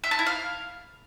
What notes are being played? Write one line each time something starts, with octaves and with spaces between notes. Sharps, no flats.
E5
A5
E4
F5